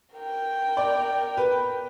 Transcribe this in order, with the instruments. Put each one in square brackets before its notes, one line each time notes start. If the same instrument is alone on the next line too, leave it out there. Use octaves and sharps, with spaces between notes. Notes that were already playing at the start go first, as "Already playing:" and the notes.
[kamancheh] A#4 G5
[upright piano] D5
B4